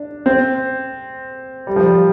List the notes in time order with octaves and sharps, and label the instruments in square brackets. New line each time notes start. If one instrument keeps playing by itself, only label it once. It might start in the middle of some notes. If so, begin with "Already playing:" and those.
Already playing: [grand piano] D4
C4
G3
F3
G3